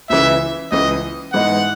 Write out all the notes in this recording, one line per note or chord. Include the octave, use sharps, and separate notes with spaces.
C#2 C#3 E3 E5
C#2 C#3 E3 D#5
G#2 E3 B3 D#4 F#5